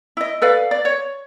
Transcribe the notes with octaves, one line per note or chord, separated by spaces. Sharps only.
E4 D#5
A4 B4 D5 F5
D5
C#5